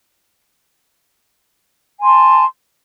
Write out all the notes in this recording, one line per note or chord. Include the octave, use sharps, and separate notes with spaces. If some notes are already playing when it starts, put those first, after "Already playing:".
G#5 A5 C6